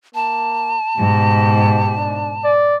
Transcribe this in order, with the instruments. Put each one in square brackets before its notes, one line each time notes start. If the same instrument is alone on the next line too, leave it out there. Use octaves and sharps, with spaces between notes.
[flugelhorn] A#3 [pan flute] A5
[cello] G#2 B2 [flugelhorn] G4
[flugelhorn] D4
D5